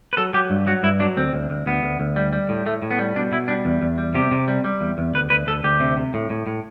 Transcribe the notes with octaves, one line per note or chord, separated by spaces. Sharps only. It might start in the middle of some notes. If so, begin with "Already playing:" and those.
B4
F#3 A4
F#3 G4
G2
F#3 F#4
G2 E4
F#3 D4
D2 C4
D2
D2
D2 B3
D2
D2
G3
G3
A2
A2 A3
A2
B3
G3
B2 D4
B2 E4
G3 D4
E2
E2
G3
C3 G4
C3
G3
G3
E2
E2
D2 B4
D2 B4
D2 A4
D2 G4
C3
C3
A2
A2
A2